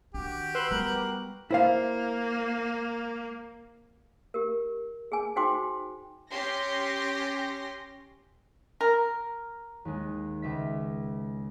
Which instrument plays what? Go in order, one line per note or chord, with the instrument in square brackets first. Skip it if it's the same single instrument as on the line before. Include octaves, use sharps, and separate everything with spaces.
[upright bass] D#3 D4 [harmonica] F#4 G4
[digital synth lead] B4 [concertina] C6 E6 F#6
[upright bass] G3 B3 [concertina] A#4 F#6
[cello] A#3 [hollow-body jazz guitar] E4 C5 F5
[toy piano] G4 A#4
G#4 G#5
D#4 F#4 C5 G5 C6 D6
[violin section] C#4 G4 C6 A#6
[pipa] A#4
[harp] D#2 G#3
C#2 E5 B6